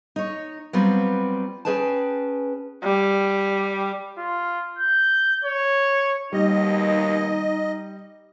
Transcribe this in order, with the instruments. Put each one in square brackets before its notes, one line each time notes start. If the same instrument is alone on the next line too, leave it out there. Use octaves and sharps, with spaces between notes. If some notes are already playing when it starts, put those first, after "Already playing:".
[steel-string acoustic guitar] D#4 C#5
F#3 G3 B3 C4 F4 B4
C#4 E4 G#4 B4 G5 A5
[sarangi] G3
[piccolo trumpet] F4
G6
C#5
[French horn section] D#2 B2 D#3 [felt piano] G3 [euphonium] D#4 [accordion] D#5